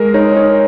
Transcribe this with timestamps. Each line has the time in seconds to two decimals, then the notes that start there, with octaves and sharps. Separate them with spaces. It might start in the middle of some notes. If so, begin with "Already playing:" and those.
Already playing: G#3 A#4
0.14 D#4 C#5
0.37 D#4 C#5